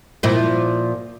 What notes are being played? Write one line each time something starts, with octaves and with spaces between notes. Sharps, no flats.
A#2 F3 E4